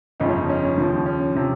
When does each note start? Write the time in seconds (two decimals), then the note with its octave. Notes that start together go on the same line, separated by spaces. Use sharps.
0.20 G1 F2 C#3 F3 D#4
0.29 C#4
0.39 D#4
0.50 C#4
0.78 D#2 C#3 F3
1.06 C#4
1.35 C3 F3